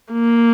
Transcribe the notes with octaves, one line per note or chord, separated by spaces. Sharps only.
A#3